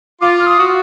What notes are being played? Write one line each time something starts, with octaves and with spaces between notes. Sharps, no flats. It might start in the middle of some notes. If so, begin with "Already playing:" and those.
F4 D6
F6
D#6
F#4